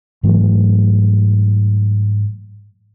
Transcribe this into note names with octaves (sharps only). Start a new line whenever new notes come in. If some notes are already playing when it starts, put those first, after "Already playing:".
G#2 E3 F#3 A3